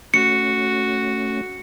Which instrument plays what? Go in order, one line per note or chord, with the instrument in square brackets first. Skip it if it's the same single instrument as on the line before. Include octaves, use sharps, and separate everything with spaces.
[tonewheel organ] A3 C#4 [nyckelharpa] F#4 [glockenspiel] C#7